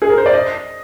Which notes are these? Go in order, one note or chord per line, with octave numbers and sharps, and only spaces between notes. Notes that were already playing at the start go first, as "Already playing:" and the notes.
G#4
A#4
C5
D5
D#5